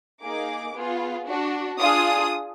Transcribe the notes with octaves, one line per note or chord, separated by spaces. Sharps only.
A#3 D#4 G#4 D6
B3 F4 G#4
D4 F#4
D4 F4 G#4 D#6